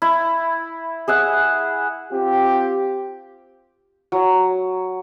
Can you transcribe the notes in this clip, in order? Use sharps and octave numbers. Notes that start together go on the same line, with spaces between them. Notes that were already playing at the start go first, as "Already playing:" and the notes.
E4
G#4 E5 F#5
C4 F4 G4
F#3